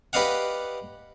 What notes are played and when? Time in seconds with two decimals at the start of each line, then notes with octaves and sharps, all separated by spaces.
0.13 G4 B4 D5 D#5 F5 F#5